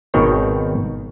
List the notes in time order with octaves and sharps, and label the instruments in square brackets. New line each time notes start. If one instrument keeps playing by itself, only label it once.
[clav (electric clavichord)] G#1 B2 D#3 C4 C#5